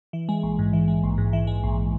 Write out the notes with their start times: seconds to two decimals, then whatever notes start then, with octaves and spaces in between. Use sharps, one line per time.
0.13 E3
0.29 G#3
0.43 A#1
0.59 G#2
0.73 E3
0.88 G#3
1.03 A#1
1.18 G#2
1.33 E3
1.47 G#3
1.63 A#1